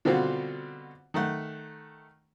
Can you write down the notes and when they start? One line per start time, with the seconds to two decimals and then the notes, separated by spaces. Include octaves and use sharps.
0.05 B2 D3 G3 C4 F4 F#4
1.14 D#3 A3 F#5